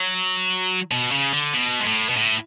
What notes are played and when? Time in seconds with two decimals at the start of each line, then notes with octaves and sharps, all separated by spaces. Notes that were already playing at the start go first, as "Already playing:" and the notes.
Already playing: F#3
0.91 B2
1.12 C#3
1.33 D3
1.53 B2
1.80 G#2
1.85 A2
2.09 B2
2.16 A2